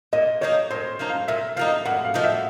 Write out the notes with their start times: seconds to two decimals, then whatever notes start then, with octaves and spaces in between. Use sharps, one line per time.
0.13 A#2 D#5
0.41 F3 A#3 D#4 C#5
0.70 A#2 C5
0.99 F3 A#3 D#4
1.09 F5
1.28 A#2 E5
1.56 F3 A#3 D#4 F5
1.86 A#2 F#5
2.05 F5
2.14 F3 A#3 D#4
2.24 E5